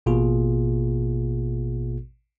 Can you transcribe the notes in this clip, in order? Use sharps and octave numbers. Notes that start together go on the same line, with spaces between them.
A1 B2 A#3 F4 G#4